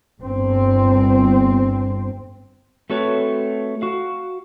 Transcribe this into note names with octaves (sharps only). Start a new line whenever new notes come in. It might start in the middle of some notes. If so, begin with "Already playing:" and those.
G1 C4
A3 C4 F#4 A4 B4 C#5
F#4 F5